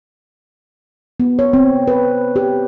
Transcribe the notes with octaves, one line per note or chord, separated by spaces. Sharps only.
B3
C#5
C4
B4
G4